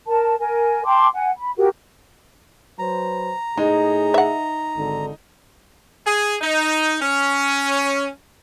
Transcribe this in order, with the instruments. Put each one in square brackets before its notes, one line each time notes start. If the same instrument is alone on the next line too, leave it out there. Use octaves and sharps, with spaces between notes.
[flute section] A#4 A5
A#4 G#5
G5 A5 C6 D6
F#5 G#5
B5
F#4 G4 A#4
[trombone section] F#3 B4 C5 [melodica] A#5
[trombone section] A2 G#4 [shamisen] G#3 [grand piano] D#4
[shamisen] E5 F#5
[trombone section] G#1 D3
[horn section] G#4
D#4
C#4